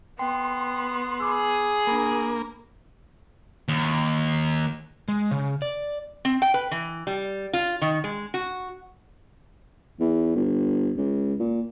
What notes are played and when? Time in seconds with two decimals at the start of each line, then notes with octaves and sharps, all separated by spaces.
0.19 B3 G5 C6
1.20 G#4 B5 D6 E6
1.87 A#3 D4 B5
3.69 D#2
5.08 G#3
5.31 C#3
5.62 D5
6.25 C4
6.42 G5
6.54 B4
6.71 E3
7.07 G3
7.53 F4
7.81 D#3
8.04 G#3
8.34 F#4
10.00 E2
10.36 G1
10.97 C#2
11.40 A#2